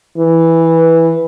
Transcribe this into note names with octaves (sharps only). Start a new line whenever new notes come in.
E3